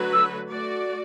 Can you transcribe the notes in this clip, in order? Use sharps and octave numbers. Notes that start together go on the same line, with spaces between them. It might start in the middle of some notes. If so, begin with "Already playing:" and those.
Already playing: D3 F#3 A3 F#4 B4
E6
A3 F#4 D5